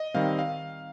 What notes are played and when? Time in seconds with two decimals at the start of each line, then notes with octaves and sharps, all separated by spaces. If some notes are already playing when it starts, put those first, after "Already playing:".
Already playing: D#5
0.14 D#3 G3 C4 F5
0.39 F5